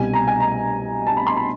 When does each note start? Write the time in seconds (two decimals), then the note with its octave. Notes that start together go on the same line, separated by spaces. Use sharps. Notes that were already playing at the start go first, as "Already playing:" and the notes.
Already playing: C2 B2 G3 G#5
0.14 A#5
0.27 G#5
0.40 A#5
1.07 A5
1.17 B5
1.27 C6
1.37 B5